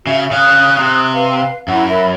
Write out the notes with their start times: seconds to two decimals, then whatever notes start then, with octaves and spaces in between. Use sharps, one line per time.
0.07 C#3 F#4 E5
0.31 C#3 F5 D#6 F#6
0.79 C3
1.13 B4 F5
1.68 F#2 E4 F#5
1.88 A#4 E5 B5